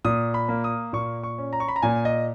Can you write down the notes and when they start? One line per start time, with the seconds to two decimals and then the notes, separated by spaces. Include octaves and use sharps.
0.05 A#2 D#6
0.34 B5
0.49 A#3
0.64 D#6
0.93 A#2 C#6
1.23 C#6
1.38 C#4
1.53 A#5
1.60 C#6
1.68 B5
1.76 A#5
1.82 A#2 G#5
2.05 D#5